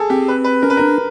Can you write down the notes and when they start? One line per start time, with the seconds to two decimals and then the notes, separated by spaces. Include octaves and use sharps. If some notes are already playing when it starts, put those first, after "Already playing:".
Already playing: G#4 A4
0.10 C4 G4
0.28 B4
0.44 B4
0.62 C#4 A#4
0.70 B4
0.77 D4 A#4